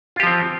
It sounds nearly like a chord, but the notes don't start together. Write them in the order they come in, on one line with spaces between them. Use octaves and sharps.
F4 G4 F3 C4